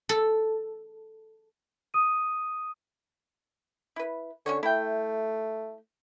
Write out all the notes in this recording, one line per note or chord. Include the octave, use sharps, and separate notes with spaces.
A4
D#6 D#7
E4 B4
D3 C#4 F#4 C#5
A3 E4 G5